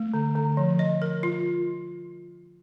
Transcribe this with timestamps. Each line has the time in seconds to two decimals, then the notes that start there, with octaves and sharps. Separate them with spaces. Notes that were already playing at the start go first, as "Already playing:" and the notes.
Already playing: A3
0.14 D3
0.36 D3
0.57 F3
0.79 D#5
1.02 A#4
1.23 F4